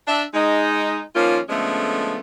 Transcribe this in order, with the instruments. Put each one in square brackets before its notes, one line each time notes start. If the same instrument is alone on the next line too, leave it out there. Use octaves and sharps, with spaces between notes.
[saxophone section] D4 E5
G#3 D#4
D#3 F3 A#3 C#4 F4
D3 F3 G#3 A3 B3 C#4